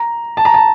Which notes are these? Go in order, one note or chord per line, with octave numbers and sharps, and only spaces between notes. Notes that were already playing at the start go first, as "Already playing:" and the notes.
Already playing: A#5
A5
A#5
A5